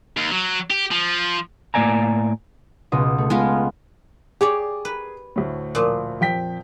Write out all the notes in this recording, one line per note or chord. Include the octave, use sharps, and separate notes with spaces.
D#2
F#3
G4
F3
A2 A#3 D5 G#5 A#5
C#2 B2 D#6
A3
G#3 B3 F4
G4 G#4 C#5 D5
B4
D2 A2
A#2 F3
F2 G5 B6